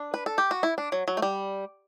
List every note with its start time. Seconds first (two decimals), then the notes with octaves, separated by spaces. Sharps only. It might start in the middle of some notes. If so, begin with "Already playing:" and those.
Already playing: D4
0.14 B4
0.26 A4
0.38 G4
0.51 F#4
0.63 E4
0.78 D4
0.92 F#3
1.08 F#3
1.17 A3
1.22 G3